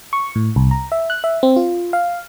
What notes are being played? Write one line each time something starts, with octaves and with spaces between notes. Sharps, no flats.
C#6
A2
C2
A#5
E5
F#6
E5
C4
F4
F5